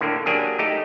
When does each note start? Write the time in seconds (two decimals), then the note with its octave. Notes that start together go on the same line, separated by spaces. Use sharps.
0.01 A2 D3 A#3 D4
0.26 F#3 A#3 D4 G4 G#4
0.59 A3 D#4 G4